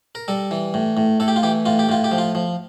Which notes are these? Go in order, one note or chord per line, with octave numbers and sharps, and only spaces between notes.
A#4
G3 A4
E3
A2
A2
A2 A4
G4
F4
E3 G4
A2 F4
G4
A2 F4
G4
F3
F4
F3